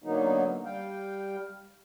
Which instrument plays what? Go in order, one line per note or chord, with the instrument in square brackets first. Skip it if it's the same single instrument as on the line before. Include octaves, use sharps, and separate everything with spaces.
[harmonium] D3 F#3 A#3 B3 D#4
G3 F5 G5